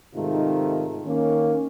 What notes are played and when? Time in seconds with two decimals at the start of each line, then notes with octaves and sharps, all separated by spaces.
0.15 G#2 C3 D#3 A3 D#4 F4
1.05 D#3 A#3 C#4